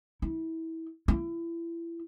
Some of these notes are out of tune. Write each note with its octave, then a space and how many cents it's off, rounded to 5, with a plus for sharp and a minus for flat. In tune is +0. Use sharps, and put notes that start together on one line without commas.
E4 -25
E4 +30